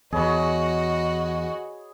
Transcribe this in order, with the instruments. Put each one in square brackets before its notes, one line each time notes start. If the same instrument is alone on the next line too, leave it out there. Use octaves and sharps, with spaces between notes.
[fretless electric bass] E2 [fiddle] F#4 D#5 [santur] G#4 C#5 B5